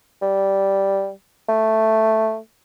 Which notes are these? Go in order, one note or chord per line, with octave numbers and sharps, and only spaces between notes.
G3
A3